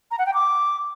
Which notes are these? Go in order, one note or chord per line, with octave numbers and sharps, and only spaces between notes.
A#5
F#5
G5
D6